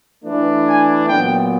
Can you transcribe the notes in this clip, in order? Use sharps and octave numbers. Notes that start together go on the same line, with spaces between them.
E3 A3 D4
G#5
A#2 F#3 B3 G5